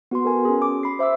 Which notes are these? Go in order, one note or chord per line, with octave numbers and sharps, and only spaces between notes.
B3 F#4 B4 C6
A4 A#4 G#5
C#4 G#4
D6
B5 C7
C5 E5 D6 E6